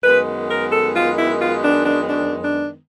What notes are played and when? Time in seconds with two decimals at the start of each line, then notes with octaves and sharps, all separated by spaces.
0.04 F#2 D#3 G#3 B3 B4
0.49 A#4
0.72 A4
0.95 F4
1.18 E4
1.40 F4
1.64 D4
1.86 D4
2.08 D4
2.43 D4